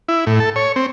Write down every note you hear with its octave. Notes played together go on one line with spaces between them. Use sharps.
E4
A2
A4
C#5
C4